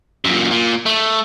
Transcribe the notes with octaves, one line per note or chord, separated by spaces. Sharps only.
F#2 A#2
A#2
A3